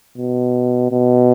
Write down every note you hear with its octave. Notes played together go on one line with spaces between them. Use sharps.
B2
B2